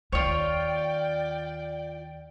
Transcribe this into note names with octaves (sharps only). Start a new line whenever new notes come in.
D#2 F4 C#5 D5 G5